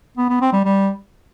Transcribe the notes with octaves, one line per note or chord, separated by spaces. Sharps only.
B3
B3
C4
G3
G3